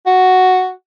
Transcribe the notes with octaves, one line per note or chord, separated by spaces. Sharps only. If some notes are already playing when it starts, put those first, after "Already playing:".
F#4